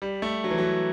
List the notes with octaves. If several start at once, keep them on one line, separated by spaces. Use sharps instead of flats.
G3
A3
F#3
E3
F#3